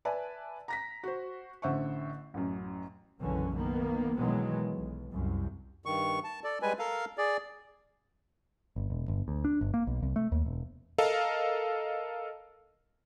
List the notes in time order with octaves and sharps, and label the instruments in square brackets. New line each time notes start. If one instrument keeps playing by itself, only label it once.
[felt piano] B4 D5 E5 G#5 A5
A#5 A#6 B6
F#4 C5
A1 D3 C5 E5 F#5 C#6
A1 F#2
[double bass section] F#1 B1 F#2 D3 E3 C#4
D#3 A#3 B3
B2 D#3 E3 F#3 G#3 B3
B1
C2 F#2
[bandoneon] G2 D#3 C#6
A5
A4 D5
G3 G#3 B4 G#5
A4 A#4 F5
G#4 D5
[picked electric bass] G1
E1
G1
D2
D4
G1
A#3
B1
C2
A3
D#2
E1
[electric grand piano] A4 A#4 D#5 F5